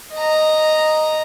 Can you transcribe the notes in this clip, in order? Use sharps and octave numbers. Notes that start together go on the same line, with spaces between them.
D#5 A#5